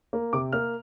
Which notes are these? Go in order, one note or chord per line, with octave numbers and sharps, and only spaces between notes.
A#3
C3 D6
A#3 F6